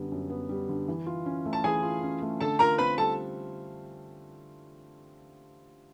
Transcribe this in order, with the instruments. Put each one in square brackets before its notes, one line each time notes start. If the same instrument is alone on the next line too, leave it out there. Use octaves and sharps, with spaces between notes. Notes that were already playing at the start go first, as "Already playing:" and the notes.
Already playing: [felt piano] F#2 D3 G3 B3
F#2
B3
G3
D3
E3
F4
C#4
A3
[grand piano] A5
[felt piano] E3 [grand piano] G#4 G#5
[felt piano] F4
C#4
A3
[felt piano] D3 [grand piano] A4 A5
[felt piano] F4 [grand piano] A#4 A#5
[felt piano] C4 [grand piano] B4 B5
[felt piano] G3 [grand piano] A4 A5